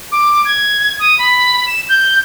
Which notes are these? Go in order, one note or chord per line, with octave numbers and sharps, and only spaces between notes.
D6
G#6
D#6
B5
E7
G6